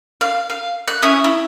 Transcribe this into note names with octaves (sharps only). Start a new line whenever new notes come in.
F5
F5
F#6
C#4 E4 G#5 D#6
E4